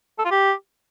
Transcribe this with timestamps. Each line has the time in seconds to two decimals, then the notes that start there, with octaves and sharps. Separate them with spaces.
0.19 A4
0.25 F4
0.31 G4